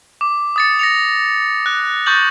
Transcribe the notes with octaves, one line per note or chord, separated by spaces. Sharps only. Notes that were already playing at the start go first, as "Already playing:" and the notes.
D6
D#6 A6 C#7
A#6 C#7 F7
F#6
C#6 D#6 F#6 G6 A6 F#7